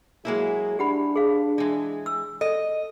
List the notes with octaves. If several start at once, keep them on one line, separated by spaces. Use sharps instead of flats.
F#3 G#3 A#3 E4 G#4
D4 G4 F#5 B5
G#4 F5
E3 G#3
E6
A4 D#5